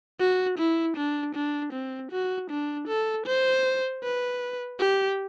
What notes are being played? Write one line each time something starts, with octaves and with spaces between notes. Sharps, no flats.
F#4
E4
D4
D4
C4
F#4
D4
A4
C5
B4
G4